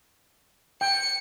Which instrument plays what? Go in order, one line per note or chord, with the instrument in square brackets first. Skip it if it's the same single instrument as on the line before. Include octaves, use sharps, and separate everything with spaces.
[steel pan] G5 [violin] C#7